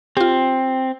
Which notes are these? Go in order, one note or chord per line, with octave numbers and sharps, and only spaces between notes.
C4 F4 G4